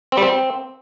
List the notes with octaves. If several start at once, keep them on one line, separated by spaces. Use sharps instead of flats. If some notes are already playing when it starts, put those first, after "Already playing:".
C4
G3
C4